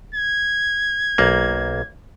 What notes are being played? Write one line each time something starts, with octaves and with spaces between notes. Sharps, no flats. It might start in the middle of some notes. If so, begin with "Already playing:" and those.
G#6
B1 A#3